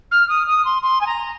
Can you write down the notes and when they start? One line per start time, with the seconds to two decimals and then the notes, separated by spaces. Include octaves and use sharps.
0.11 F6
0.29 D#6
0.47 D#6
0.65 C6
0.82 C6
1.01 G#5
1.06 A#5